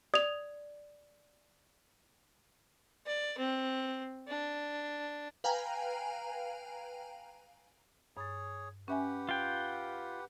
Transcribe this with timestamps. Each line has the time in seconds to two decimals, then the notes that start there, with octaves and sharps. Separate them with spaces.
0.14 D5 D#6 F7
3.06 D5
3.38 C4
4.28 D4
5.44 B4 F5 G5 G#5 A#5
8.17 G2 G#4 C#5 A6
8.88 C#4 G4 B4 E5 F#5 G#5
9.29 F4 G5